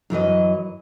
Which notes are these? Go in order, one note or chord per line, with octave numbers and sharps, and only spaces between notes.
F#2 E3 F#3 D#5